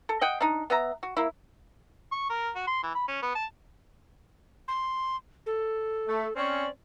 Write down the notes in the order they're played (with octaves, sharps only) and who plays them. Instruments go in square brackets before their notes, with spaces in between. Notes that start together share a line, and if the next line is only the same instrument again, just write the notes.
[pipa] A4
D#5 F#5 G5
D4 D#4
B3 E5 A#5
F#4
A#3 E4
[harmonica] C#6
A#4
F#4
C6
E3
B5
C#4
B3
A5
[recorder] C6
A4
[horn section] A3
[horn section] C4 C#4 [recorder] D5